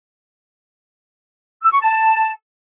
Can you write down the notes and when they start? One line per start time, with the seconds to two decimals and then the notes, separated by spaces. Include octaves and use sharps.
1.63 E6
1.73 C#6
1.82 A5